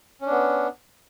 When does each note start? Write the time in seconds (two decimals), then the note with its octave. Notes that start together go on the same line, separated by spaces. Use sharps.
0.21 C#4
0.26 D4
0.31 B3